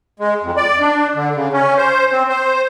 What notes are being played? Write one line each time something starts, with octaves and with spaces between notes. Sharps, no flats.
G#3
F2
D5
D4
D3
C#3
C#4
C5
C4
C5